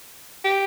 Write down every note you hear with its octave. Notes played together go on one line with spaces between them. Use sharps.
G4